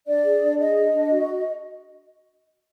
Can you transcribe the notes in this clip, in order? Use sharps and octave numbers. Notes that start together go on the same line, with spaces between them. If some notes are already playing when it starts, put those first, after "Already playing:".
D4 D5
G#4
D4
G#4 D#5
D4
D4
F#4